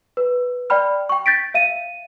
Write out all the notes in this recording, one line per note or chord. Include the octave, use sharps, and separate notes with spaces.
B4
D5 G5 B5 F6
G5 C#6
G6 A6 B6 D7
E5 F5 D#7